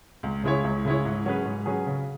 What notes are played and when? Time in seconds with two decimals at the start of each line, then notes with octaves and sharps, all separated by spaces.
0.23 C#2
0.43 C#3 G#3 E4 C#5
0.64 C#2
0.85 C#3 G#3 E4 C#5
1.05 G#2
1.25 F#3 C#4 G#4 B4
1.45 G#2
1.66 F#3 C#4 G#4 B4
1.87 C#3